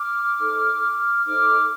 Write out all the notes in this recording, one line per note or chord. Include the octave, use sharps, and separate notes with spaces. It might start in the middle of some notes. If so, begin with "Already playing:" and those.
Already playing: D6 F6
D#4 A4 C5
D#4 A4 C5 D6 F6